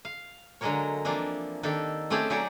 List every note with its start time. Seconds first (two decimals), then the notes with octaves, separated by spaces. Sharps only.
0.05 F5
0.61 D3 F#3 G#3 A#3 A#4 C#5
1.05 E3 F3 A#3 C4 D4
1.63 D#3 A#3 D4 G4 A4
2.10 A3 C4 C#4 G4 G#4 A5
2.30 F#3 D#4 G4 G#4 C#5 D5